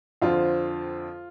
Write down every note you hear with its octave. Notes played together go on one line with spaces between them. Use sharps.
F2 D3 F3 C4 F4